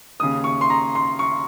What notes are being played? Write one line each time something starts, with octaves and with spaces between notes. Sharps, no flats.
D#2 C#3 D#6
C#6
C6
A#5
C6
C#6